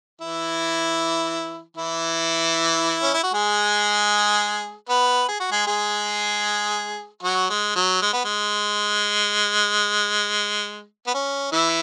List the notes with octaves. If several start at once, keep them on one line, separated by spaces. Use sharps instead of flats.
E3 E4
E3 E4
C#4
E4
F#4
G#3 G#4
B3 B4
G#4
F#4
G#3 G#4
G#3 G#4
F#3 F#4
G#3
F#3
G#3
B3
G#3
B3
C#4
E3 E4